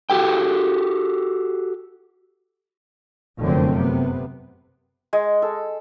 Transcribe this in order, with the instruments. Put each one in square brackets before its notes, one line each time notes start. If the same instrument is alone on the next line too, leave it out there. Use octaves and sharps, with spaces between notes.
[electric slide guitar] F#4 G4 A4 G5
[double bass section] F1 F#2 D3 A3 C4
C3 B3
[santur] G#3
A4